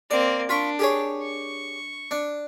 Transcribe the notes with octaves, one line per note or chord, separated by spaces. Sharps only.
A#3 C4 D5
D4 F4 B5 C#6
G4 G#4 C#5
C#6
D4